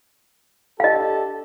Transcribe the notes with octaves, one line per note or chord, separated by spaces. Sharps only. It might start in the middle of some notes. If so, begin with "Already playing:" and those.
D4 G4 A4 D#5 F5